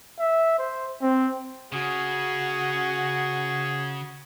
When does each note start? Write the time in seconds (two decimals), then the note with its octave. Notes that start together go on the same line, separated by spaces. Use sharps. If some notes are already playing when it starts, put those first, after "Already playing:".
0.19 E5
0.58 C5
1.02 C4
1.72 C#3 F#4 G#4